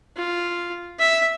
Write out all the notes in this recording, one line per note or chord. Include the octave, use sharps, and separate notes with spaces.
F4
E5